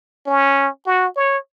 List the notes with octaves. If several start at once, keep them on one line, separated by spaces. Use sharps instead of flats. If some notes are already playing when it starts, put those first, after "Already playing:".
C#4
F#4
C#5